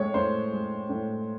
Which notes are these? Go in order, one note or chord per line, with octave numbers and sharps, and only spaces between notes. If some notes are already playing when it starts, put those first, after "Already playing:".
Already playing: A2 G#3 C#5
A2 C5
G#3
A2